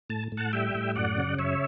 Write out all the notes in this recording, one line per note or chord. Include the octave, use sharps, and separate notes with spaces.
A2 A5
A2
F#5 A5
G3 E5 G5
A2
F#2 D5 F#5
C#3
F#2 C#5 E5